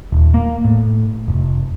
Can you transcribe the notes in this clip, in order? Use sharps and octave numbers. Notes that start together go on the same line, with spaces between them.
D#1
A#3
A2
F1